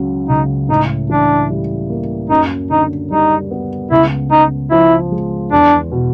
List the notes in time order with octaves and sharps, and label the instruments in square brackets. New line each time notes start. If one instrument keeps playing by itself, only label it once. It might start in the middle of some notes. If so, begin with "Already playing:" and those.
Already playing: [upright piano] C#2 C#3 F#3
[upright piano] C#2 [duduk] D#4
[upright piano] A2 [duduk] D#4
[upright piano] E3 [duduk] D4
[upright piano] G3
A#3
[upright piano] F#2 [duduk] D#4
[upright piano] D3 [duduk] D#4
[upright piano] G3 [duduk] D#4
[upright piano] B3
[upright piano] C#2 [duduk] E4
[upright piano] C#3 [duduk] D#4
[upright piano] F3 [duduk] E4
[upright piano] G#3
[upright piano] E2 [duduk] D4
[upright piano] B2